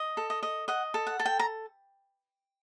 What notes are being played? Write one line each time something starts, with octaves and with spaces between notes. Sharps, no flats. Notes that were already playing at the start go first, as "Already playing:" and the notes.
Already playing: D#5
A4
D#5
D#5
D#5 F#5
A4
F#5
A4
G5
A#5